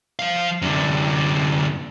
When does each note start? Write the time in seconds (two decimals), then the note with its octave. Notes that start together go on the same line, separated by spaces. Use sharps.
0.19 F3 F5
0.62 F#2 D3